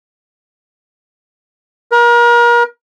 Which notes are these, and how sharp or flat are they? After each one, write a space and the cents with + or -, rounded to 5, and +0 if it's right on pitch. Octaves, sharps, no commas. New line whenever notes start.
A#4 +35